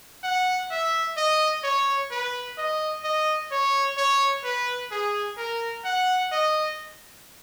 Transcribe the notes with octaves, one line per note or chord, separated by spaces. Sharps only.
F#5
E5
D#5
C#5
B4
D#5
D#5
C#5
C#5
B4
G#4
A#4
F#5
D#5